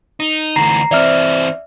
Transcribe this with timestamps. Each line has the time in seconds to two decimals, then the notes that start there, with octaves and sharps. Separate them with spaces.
0.20 D#4
0.56 D2 E3 A#5 C7
0.91 E3 C4 D5 E5 F6